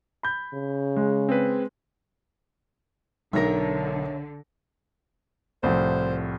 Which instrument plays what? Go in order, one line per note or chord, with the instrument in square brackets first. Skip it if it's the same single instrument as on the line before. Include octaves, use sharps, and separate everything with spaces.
[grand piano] B5 G6
[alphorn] C#3
[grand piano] G#3
[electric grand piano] C4 G#4 B4
[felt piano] B1 A#6 [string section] D3 [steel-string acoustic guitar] A#4 C#5 E5
[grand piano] C2 A2 F3 [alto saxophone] C5